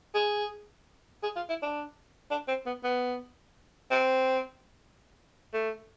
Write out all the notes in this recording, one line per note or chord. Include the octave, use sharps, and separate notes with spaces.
G#4
G#4
F4
E4
D4
D4
C4
B3
B3
C4
A3